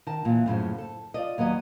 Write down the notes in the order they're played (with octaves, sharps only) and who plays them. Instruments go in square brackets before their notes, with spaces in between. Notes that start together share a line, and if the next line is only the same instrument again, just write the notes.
[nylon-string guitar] D#3 A5
A#2 E3
F#2 A2 C#3 F3
A4
F4 D5 D#5
D#2 F#3 B3 D#5